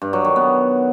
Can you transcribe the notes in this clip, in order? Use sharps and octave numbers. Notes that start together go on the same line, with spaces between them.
G2
F#3
D#3
B3